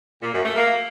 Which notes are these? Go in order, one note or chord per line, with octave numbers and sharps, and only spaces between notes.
A#2
F#2
A3
A#3